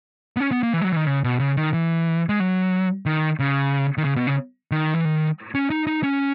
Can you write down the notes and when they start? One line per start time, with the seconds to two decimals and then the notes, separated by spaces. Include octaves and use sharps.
0.37 B3
0.40 C#4
0.52 B3
0.63 A#3
0.73 E3
0.81 G#3
0.84 F#3
0.92 E3
0.96 D#3
1.07 C#3
1.24 B2
1.39 C#3
1.57 D#3
1.74 E3
2.29 G#3
2.40 F#3
3.06 D#3
3.39 C#3
3.98 D#3
4.05 C#3
4.16 B2
4.27 C#3
4.71 D#3
4.94 E3
5.05 D#3
5.55 C#4
5.70 D#4
5.87 D#4
6.03 C#4